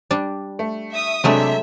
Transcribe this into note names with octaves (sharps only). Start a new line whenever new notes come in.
G3 D4
A3
E5 D#6
C3 F#3 G#3 A3 D4 E5